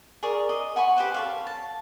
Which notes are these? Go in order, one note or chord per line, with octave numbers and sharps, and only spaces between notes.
G#4 A#4 D5 C#6
D#5
F#5 G#5 B5 C#6
G4 B4 C5 F#5
A4 C#5 F5
A5